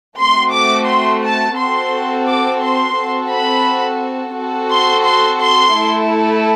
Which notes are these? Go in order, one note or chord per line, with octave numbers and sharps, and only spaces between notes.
A3 C4 F#4 C6
D6
C6
A5
C4 F#4 A4 C6
D6
C6
C4 F#4 A4
B5
C4 F#4 A4
C6
C6
C6
A3 E4 A4